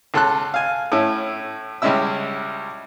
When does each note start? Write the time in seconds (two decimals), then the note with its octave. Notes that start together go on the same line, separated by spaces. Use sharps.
0.14 C#2 A4 C6 F#6
0.54 F5 G#5
0.92 A2 C#4 E4
1.82 C#2 G3 G#3 C#4 E4 E6